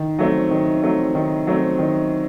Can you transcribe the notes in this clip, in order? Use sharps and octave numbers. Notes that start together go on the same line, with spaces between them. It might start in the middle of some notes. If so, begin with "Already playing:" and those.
Already playing: D#3
F#3 A3 C4
D#3
F#3 A3 C4
D#3
F#3 A3 C4
D#3